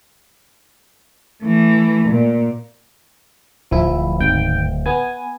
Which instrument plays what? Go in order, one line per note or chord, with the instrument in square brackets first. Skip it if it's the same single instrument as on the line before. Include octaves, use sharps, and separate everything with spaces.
[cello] E3 A3
A#2
[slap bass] D1 [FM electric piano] F3 E4
[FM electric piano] G#1 G5
B3 G#5